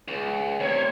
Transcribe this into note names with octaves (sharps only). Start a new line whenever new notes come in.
C#2
D2 C3 C#5